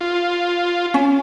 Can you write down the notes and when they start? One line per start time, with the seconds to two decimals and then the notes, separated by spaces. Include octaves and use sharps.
0.01 F4
0.94 C#4